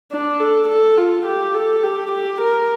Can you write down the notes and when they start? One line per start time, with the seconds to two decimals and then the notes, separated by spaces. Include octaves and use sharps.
0.12 D4
0.40 A4
0.68 A4
0.97 F4
1.26 G4
1.54 A4
1.83 G4
2.12 G4
2.41 A#4